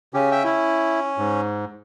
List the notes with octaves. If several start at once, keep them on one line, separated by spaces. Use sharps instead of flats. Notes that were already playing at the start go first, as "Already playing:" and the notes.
C#3 C#4 G4
E5 G5
C#4 E4
G#2